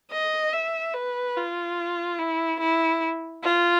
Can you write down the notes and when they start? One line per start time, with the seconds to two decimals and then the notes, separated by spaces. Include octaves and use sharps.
0.12 D#5
0.53 E5
0.94 B4
1.36 F4
2.19 E4
2.60 E4
3.44 F4